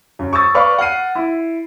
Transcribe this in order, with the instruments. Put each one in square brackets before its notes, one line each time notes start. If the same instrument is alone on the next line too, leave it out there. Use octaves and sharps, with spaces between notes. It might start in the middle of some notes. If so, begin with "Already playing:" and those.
[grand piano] F#2
C#6 D#6 E6 A6
B4 D5 F5 B5 C#6 F6
F#5 F6 C7 D#7
E4